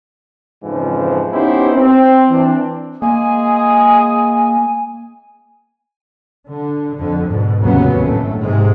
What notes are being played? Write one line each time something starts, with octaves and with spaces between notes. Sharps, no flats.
F2 G#2 C#3 E3 F3
B3 C#4 D#4 E4 G4 C5
C4
E3 C4 D4
G#3 A#3 G#4 G#5
D3
F2 D3
G#2 B2
F1 D#2 C#3 F#3 B3 C#4
G1 A2 A3
G#2 C3 G#3